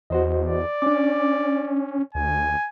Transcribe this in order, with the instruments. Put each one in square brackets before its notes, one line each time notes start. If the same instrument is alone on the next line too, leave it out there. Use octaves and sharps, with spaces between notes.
[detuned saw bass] E2 [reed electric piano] F#4 C5 D#5
[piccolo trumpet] D5
[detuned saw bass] C#4 [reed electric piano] D4 D6
[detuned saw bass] D2 [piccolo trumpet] G#5